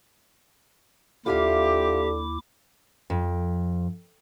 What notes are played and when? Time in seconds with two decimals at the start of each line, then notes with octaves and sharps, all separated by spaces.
1.26 D#2 D3 E4 F4 G4 E5 F5 D6
3.10 F2